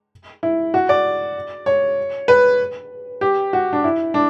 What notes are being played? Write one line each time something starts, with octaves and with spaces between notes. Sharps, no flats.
E4
F#4
D5
C#5
B4
G4
F#4
D4
E4
D4